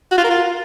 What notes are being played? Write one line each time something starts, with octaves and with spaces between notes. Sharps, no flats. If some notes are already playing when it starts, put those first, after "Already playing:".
F#4
F4
A#4
F4